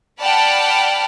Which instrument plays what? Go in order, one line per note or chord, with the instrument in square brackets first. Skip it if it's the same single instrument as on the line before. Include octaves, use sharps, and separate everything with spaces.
[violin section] D5 F#5 G5 A5 B5 F6